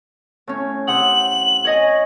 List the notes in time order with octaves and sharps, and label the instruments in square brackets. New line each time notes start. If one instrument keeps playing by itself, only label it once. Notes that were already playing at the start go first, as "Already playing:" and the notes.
[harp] A2 C#4
[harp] C3 F#5 D#6 [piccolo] F#7
[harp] C#5 D#5 G#5